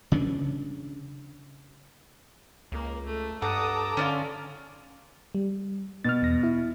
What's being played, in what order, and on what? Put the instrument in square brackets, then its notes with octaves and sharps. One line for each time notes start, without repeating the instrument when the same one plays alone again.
[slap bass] C#3 C#4 D4
[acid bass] C#2 [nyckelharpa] A#3
[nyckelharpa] A3
[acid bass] G2 [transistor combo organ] A4 A#5 D6 [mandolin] F#5 [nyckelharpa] D#6
[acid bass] D3 [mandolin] C#4 D4 F4 [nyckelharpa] D5
[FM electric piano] G3
[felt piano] B2 [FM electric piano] F6 A6
[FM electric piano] E2 A#6
E4